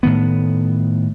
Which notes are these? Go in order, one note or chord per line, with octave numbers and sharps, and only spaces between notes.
A2 D#3 B3